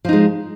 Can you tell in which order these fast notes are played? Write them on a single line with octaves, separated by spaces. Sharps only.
F3 D#4 G#3